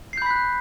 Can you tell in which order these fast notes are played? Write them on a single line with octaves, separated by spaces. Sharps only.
C7 G6 B5 B6 F#6